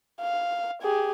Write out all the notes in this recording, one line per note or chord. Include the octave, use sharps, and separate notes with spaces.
F5
G4 G#4